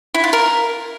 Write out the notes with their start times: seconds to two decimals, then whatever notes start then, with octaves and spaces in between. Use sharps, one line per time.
0.14 E4
0.24 F4
0.33 A#4